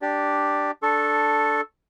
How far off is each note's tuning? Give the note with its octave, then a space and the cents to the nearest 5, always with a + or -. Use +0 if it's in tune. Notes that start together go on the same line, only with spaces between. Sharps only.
D4 +0 G4 +0 D5 +0
D4 +0 A4 +0 C#6 -30